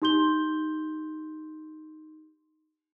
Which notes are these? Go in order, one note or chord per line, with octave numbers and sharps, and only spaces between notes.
D#4 G4 C6 G6 G7